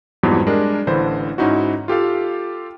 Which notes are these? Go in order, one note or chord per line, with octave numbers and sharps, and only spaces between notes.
F2 G#2 E3 F#3 G3 B3
G3 G#3 D4 G4 A#4
A1 D3 E3 C5 B5
G#2 C#4 D#4 E4 F#4
F4 G4 A4 F5